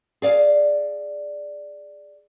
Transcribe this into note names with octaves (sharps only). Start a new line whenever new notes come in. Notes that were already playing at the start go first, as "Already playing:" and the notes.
G#4 D5 F5